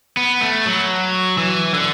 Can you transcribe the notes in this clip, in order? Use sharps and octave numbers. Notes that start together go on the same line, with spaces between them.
B3
A3
F#3
E3
D3